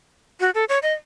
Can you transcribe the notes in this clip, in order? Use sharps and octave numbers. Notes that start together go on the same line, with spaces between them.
F#4
A4
C#5
D#5